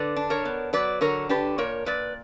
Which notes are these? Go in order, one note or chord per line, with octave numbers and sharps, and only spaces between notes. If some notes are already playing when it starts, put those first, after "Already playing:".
Already playing: D3 B4 D5
D4
A#4 C#5
B3
F#3 B4 D5
D3 A#4 C#5
D4 G4 B4
A#2 A#4 C#5
A#2 B4 D5